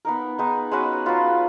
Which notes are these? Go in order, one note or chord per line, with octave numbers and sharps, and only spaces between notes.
B3 D#4 A#4
G#3 B3 D#4
G#3 C#4 F#4 B4
F#3 B3 F4